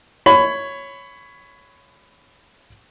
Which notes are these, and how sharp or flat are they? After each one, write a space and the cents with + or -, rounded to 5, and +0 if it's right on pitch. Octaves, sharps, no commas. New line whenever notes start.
C#5 +0 B5 +20